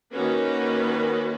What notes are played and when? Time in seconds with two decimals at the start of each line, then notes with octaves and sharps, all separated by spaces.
0.12 D#3 A#3 C#4 F#4 B4